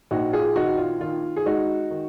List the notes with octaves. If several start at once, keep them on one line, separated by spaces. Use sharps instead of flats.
A#1 D#4 F#4
F4 G#4
D#3 D#4 F#4
F4
D#3 F4
G#4
G#3 D#4 F#4
D#3